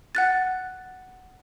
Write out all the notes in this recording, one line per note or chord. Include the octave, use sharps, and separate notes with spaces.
F#5 F#6 A6